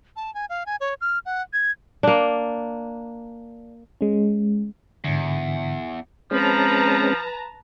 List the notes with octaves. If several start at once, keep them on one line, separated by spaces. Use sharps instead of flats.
A5
G#5
F5
G#5
C#5
F6
F#5
G#6
A#3 D4
G#3 C#4
E2 G#2 D3
F3 G#3 C4 C#4 B4 A5 A#5